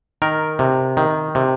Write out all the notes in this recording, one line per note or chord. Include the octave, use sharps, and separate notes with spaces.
D#3 A#4
C3
D#3
C3